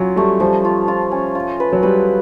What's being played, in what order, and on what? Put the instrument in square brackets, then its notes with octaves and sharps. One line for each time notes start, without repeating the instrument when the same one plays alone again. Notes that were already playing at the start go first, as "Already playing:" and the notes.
Already playing: [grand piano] F#3 [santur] C#4 F4
[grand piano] G3 [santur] A3
[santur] F3 [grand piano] G3
[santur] F4
F4
C#4
F4
B4
[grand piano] F#3
[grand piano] G3 [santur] B4